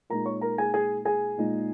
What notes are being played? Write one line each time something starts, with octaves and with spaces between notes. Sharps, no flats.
A#2 G#3 D#4 A#4 A#5
C#5 C#6
A#4 A#5
G#4 G#5
G#4 G#5
G#4 G#5
A#2 G#3 D#4